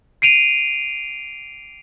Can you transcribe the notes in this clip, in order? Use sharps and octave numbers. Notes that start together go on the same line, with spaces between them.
C7 D7 D#7 F7